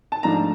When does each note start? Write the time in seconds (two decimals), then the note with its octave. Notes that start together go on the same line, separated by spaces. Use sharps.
0.12 A5
0.23 G#2 F3 A3 D4 A#5